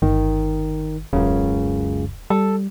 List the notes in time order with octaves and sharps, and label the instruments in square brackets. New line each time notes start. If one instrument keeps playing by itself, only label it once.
[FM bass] G1 [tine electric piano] D#3
[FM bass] D#1 [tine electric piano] C#2 F#2 C#3
[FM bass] G3 [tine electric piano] A4